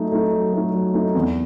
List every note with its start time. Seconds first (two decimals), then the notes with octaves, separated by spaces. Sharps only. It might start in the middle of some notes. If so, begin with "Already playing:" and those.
Already playing: F#3 A3 D#4
0.12 A3 D#4
0.33 F#3
0.53 A3 D#4
0.74 F#3
0.94 A3 D#4
1.15 E2